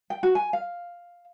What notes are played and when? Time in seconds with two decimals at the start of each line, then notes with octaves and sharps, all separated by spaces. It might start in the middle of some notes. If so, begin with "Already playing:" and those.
0.10 G5
0.23 F#4
0.35 G#5
0.53 F5